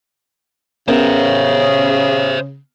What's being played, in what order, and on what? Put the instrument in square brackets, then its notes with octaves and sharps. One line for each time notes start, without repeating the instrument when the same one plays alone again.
[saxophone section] C#3 [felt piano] B3 C#4 A#4 [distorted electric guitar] C5 E5